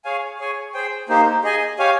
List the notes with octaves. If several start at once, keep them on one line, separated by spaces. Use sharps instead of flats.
G#4 C#5 F5 G#5
G#4 C#5 G#5
G#4 C5 G5
A#3 D#4 G4 C5
G#4 D#5 G#5
G4 C#5 F5 G#5